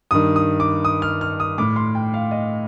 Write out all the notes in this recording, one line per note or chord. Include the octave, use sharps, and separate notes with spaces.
G2 D#3 D#6
D#6
D6
D#6
F6
F6
D#6
A2 D6
C6
G5
F5
D#5